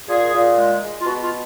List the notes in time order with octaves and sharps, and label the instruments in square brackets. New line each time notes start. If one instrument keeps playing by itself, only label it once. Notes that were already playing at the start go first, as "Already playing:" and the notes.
[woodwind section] A#2 G#4
A#2
G#3
G#3
F4
B2 F#4
F4